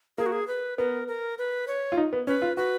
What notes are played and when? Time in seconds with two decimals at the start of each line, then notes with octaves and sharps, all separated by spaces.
0.18 A#3 G#4
0.26 F#4
0.32 G#4
0.48 B4
0.78 B3 A#4
1.08 A#4
1.38 B4
1.68 C#5
1.92 F4
1.97 D#4
2.13 B3
2.27 C#4 B4
2.42 F4
2.57 F#4 B4